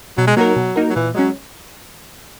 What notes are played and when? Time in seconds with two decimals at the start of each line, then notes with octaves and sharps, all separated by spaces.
0.18 B2 F#3
0.27 G#3
0.36 F#3 A#3 D#4 F#4 A#4
0.56 B2
0.76 A#3 D#4 F#4 A#4
0.90 F#3
0.96 A#2 E3
1.15 F#3 G#3 C#4